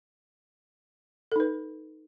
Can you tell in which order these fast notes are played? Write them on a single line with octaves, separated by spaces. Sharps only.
A4 D#4 B4